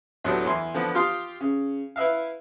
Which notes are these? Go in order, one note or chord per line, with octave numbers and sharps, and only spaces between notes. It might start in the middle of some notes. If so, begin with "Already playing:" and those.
D2 A2 F#3 B3 G4
E2 E3 C6
D3 F3 B3
F4 G4 F5 C6 D#6
C#3
E4 B4 E5 F5